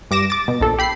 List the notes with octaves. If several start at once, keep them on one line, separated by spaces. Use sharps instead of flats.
G2 D6 A#6 E7
D6 A6
B2
A#1 A4
G4 B5 C7